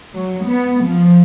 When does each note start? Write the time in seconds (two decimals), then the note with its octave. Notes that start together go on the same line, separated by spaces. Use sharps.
0.14 F#3
0.45 B3
0.84 F3